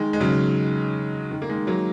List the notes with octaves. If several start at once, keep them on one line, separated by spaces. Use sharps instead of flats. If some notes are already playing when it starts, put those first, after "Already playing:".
Already playing: D#3 G#3
G#3
C#3 F#3
D#3
A#3
D#3 G#3
F#3 A#3